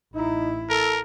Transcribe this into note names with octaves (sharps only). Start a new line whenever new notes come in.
A1 D#4 E4
A4 A#4